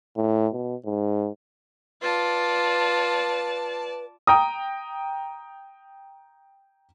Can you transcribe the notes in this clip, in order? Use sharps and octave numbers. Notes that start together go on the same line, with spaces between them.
A2
B2
G#2
F4 B4 D5 A5
G5 A#5 D#6